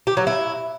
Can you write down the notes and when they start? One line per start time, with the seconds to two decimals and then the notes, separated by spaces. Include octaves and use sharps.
0.07 G4
0.17 F#3
0.27 E4